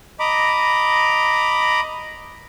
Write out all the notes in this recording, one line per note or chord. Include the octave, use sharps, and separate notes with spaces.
D#5 A#5 B5 D6